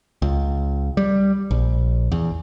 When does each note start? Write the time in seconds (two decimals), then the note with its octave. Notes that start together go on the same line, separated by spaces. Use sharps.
0.22 C#2
0.97 G3
1.51 A#1
2.12 E2